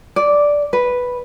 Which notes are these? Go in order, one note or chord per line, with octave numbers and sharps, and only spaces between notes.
D5
B4